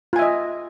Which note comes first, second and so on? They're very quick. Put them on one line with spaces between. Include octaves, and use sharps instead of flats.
F4 G#5 E5 D#5